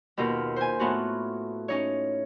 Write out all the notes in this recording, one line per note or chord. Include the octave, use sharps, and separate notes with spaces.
D#2 B2 F4 A#4
C5 G#5
A2 B3 F4 F#4
C#4 D#4 C#5